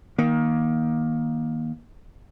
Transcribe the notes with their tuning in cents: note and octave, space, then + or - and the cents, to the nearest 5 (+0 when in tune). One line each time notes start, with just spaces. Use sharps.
D#3 +15 A#3 +20